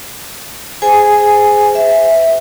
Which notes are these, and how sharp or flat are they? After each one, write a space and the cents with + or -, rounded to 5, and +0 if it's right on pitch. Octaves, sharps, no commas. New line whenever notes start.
G#4 +0 C5 -25 G#5 +0
C5 -45 E5 -5